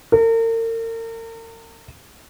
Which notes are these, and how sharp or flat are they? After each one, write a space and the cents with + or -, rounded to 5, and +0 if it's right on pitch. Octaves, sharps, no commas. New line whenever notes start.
A#4 -40